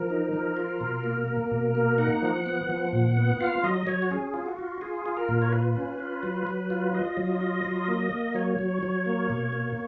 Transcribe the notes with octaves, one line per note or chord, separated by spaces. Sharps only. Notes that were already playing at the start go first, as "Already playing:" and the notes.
Already playing: F3 A#4
D#4
F3
F4
B2
A#3
A#3
B2
A#3
D#4 F#5
F3
B3
F3
A#2
B3
F4 F5
F#3 D#5
F#3 C#5
F#4
C#4 G#4
F4
F#4
F4
F4 G#4
F4
A#4
A#2
C#5
F4 B4
C#4
F4
F#3
F#3
F4
F4 D#5
F#3
F4
F#3
A#3
A#3
F#3 C#5
F#3
F#3
A#3
B2
A#3